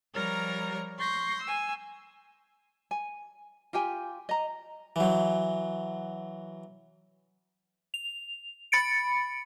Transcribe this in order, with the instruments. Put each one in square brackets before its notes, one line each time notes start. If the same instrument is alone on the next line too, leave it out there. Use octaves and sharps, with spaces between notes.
[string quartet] F3 G3 A#4 C#5 A#5
C6 C#6 G6 A#6
G#5 E6
[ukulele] G#5
F4 G4 G5 G#5
D#5 A#5
[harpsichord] E3 F#3
[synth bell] F7
B5 A6 C#7 D7